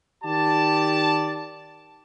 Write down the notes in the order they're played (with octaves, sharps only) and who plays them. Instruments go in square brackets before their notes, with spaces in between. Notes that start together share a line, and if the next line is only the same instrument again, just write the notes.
[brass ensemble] D#3 G4 D5 A5